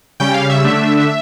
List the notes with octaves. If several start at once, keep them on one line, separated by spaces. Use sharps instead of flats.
C#3 G3 C#4 G5
F5
E5
D3 A3 D4